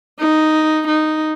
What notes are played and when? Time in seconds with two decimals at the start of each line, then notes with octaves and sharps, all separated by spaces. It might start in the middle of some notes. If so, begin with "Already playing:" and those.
0.20 D#4
0.88 D#4